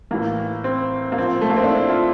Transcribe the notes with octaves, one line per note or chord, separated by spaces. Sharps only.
A2 E3 A#3
C4
A#3
A#2 F3 C4
A3
A#3
C4
D4
E4
F4